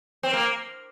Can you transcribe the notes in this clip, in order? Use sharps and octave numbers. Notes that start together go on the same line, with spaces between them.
C4
A#3